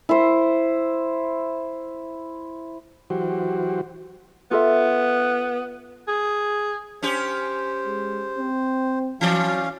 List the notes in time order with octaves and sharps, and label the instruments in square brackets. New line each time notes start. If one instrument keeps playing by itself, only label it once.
[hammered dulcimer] E4 C5
[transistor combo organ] E3 F#3 F#4 G4 C5
[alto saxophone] B3 [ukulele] F4 A4 E5
[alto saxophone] G#4
[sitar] C#4 G4 [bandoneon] C5
[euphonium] G#3
C4
[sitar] E3 D5 [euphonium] F#3 [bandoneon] C#4 F5